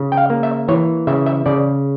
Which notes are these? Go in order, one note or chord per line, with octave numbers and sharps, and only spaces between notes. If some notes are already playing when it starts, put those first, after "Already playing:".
Already playing: C#3
G5
F5
A#3
E5
E3 C#5
C#3 E5
E5
C#3 D5